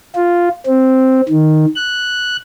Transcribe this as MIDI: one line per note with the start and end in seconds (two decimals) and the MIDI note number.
0.15 0.48 65
0.66 1.21 60
1.29 1.66 51
1.75 2.36 90